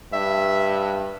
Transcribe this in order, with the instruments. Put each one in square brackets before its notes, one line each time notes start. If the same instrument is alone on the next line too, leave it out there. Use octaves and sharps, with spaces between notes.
[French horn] G2 [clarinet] E5